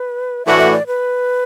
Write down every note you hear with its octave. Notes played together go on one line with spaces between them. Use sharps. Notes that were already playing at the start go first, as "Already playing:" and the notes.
Already playing: B4
A2 E3 A3 D4 F#4 E5
E5
D5
B4